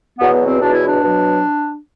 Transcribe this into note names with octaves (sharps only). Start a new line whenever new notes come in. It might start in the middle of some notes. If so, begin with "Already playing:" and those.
E2 B2 F#3 B3
B3
C4
E2 B2 F#3 D4
E4
D4
B2 F#3